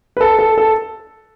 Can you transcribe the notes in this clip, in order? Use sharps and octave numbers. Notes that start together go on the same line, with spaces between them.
B4
A4
A4
A4